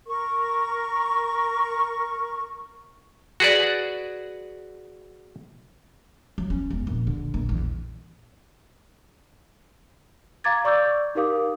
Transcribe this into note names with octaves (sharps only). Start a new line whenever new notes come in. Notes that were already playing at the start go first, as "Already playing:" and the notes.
A#4 C#6
F#4 G#4 B4 D5
F#3
C#4
E1
A#1
D3
A#1
E2
F5 A#5 D6 G#6 A6
D5 C#6 D6 E6 G6
D#4 G4 A#4 F5 D6 D#6